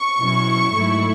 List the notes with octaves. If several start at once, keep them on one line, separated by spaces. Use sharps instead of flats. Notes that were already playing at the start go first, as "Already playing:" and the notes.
Already playing: C#6
B2 F#3 C#4 E4
G#2 D#3 F#3 A3 E4